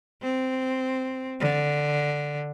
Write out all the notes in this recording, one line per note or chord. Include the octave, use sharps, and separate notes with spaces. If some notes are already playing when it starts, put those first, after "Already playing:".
C4
D3